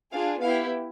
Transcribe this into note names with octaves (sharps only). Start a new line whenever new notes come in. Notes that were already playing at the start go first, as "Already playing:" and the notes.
D4 F4 G#4 F5
B3 E4 G4 F5